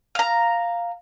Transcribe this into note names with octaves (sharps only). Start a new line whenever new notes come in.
F5 A#5